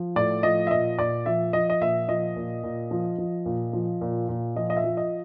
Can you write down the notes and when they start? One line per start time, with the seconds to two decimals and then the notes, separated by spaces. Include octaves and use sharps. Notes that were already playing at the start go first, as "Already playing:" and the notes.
Already playing: F3
0.16 A2 D5
0.43 F3 D#5
0.67 E5
0.71 A#2 D#5
0.98 A#2 D5
1.26 F3 E5
1.53 F3 D#5
1.70 D#5
1.81 A#2 E5
2.08 F3 D#5
2.36 A#2
2.63 A#2
2.91 F3
3.18 F3
3.46 A#2
3.73 F3
4.01 A#2
4.29 A#2
4.56 F3 D#5
4.70 D#5
4.76 E5
4.84 F3
4.97 D#5